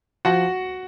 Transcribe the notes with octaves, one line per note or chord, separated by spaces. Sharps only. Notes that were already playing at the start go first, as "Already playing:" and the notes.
F3 F#4 F#5